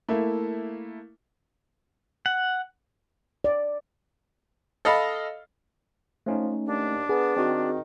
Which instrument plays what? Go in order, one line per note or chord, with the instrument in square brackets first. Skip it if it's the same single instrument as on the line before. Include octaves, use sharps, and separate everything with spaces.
[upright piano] A3 A#3 E4
[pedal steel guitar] F#5
[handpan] D5
[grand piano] A4 D#5 F5 B5
[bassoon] F3 [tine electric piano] A3 C#4 D#4
[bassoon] D#2 [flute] D4
[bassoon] B3 [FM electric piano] G#4
[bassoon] D#3 [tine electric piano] C4 F#4